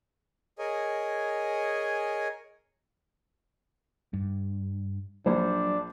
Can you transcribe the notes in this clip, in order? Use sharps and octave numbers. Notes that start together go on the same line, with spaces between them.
G#4 A#4 C#5 D#5 G#5
G2
A#1 F#3 D4 C5